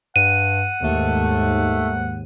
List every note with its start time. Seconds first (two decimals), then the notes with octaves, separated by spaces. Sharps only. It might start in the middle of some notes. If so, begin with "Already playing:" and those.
0.16 G2 F#5 D#7
0.84 D#2 G#2 A3